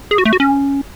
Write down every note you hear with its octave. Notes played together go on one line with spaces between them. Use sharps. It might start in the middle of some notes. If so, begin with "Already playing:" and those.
G#4
F#4
A3
F#4
C#4